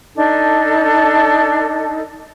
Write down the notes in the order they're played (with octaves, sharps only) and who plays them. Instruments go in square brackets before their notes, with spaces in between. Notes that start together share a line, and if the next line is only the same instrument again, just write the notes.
[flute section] D4 D#4 A4